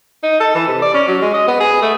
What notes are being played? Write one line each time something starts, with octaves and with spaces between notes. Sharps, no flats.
D#4
A4
E3
C3
D5
C#4
F#3
G#3
D#5
B3
G#4
A3